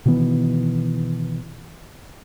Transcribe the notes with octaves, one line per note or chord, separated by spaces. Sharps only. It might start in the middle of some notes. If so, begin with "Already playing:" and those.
B2 D#3 E3 B3